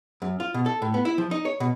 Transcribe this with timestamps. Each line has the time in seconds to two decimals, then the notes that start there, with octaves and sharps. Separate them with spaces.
0.22 F#2
0.40 F4
0.54 B2
0.66 A4
0.82 A2
0.94 B3
1.05 E4
1.18 F3
1.31 D#4
1.45 C#5
1.60 B2